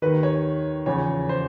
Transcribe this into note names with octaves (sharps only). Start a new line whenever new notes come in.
D#2 D#3 B4
C#5
E2 C#3 F3 C#5
C5